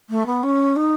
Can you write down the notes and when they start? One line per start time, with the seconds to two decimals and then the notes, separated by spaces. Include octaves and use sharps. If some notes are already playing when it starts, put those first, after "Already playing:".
0.10 A3
0.26 B3
0.43 C#4
0.76 D#4